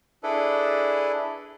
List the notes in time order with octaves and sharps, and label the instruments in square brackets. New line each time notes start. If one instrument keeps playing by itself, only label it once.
[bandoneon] D4 E4 G#4 A4 B4